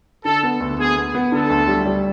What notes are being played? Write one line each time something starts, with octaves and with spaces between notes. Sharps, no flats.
D3 A4
B3
D2
B3 G#4
B3
B3
D3 A4
D2
G3
G3